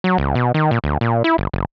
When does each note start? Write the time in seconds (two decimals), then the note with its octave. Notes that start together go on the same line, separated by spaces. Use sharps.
0.04 F#3
0.18 C#2
0.35 B2
0.54 D#3
0.71 A#2
0.84 D2
1.01 A#2
1.24 E4
1.38 G1
1.54 F#1